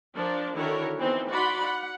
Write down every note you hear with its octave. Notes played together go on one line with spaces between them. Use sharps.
F3 D4 A#4
D3 D#3 E4 F#4 A#4 C#5
E3 B3 C4 D#4
D#4 F#4 D5 F#5 B5 C6
F#5